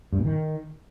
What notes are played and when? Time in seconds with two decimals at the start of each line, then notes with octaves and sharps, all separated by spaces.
0.13 G2
0.19 A#2
0.25 D#3